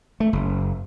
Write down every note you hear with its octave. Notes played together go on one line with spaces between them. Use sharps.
A3
F#1